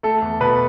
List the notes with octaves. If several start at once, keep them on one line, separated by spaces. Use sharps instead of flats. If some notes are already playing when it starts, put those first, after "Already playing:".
A3 A4
E2
B2 B4